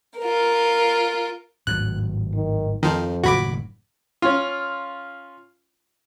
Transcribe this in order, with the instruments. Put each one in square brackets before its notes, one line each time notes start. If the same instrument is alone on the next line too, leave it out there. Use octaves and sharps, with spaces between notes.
[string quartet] F4 A#4
[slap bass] G#1 A2 F#3 [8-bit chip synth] F#6
[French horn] D#3
[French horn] F2 [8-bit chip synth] D#3 F3
[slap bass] F#1 A2 D#3 [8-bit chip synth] F#4 B5 D6
[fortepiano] C#4 F4